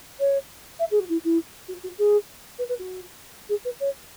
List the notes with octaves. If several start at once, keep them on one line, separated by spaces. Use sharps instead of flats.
C#5
E5
G#4
F#4
E4
E4
F#4
F#4
G#4
B4
B4
F#4
G#4
B4
C#5